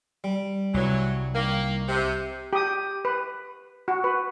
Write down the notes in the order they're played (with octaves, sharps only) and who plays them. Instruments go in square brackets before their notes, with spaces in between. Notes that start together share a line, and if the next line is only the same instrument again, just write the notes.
[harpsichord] G3
[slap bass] C2 [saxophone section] E3 F#3
[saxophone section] D#3 A#3
C3
[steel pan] G4 D#6
B4
F#4
B4